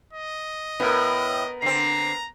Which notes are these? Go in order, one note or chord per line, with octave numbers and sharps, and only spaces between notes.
D#5
A2 B3 A#4
D3 C4 A#5 C7